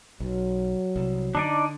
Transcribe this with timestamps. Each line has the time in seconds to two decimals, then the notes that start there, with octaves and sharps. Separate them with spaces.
0.20 B1 F#3
0.96 C2
1.35 D3 D4 D#4 D5